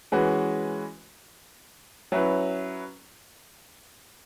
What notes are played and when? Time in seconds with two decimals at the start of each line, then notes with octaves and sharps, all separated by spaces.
0.12 E3 G#3 C#4 F#4 B4
2.12 F#3 C#4 E4 B4